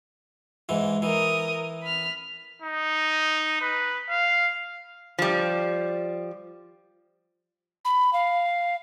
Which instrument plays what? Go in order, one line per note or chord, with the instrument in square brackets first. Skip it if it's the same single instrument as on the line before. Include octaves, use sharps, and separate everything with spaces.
[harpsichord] G#2 E3
[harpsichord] E3 [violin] A#4 D#6
[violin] B5 F6
[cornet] D#4
B4
F5
[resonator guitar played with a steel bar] F3 G3
[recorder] B5
F5